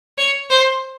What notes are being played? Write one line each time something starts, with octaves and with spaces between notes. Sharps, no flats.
C#5
C5